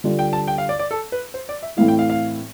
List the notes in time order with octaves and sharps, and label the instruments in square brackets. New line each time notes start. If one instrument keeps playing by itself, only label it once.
[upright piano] D3 G3 D4 F4
[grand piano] G5
A5
G5
F5
D5
D5
A4
B4
C5
D5
E5
[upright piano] A2 E3 A3 C4 E4 [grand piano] F5
[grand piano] G5
F5
F5